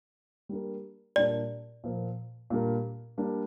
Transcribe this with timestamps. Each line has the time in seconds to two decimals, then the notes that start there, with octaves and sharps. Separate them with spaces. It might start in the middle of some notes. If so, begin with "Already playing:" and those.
0.49 G3 A#3 D4 A#4
1.16 A#2 G3 D4 G4 A#4 D5
1.84 A#2 F3 A#3
2.50 A#2 G3 D4 A#4
3.18 G3 A#3 D4